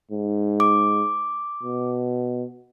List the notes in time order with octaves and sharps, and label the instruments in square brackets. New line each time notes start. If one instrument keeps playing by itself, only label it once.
[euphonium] G#2
[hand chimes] D6
[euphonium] B2